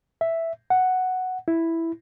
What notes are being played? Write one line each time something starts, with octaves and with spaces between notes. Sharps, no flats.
E5
F#5
E4